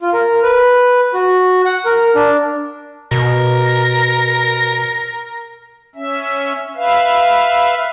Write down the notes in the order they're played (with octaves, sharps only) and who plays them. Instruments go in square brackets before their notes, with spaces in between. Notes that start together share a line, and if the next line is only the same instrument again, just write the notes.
[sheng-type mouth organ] F4
A#4
B4
F#4
F#5
A#4
D4
[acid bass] B2 [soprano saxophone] A#4
[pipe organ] C#4 E5
B4 E5 F5